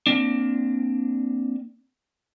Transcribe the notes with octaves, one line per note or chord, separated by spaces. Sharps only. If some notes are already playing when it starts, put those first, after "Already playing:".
A#3 C4 D4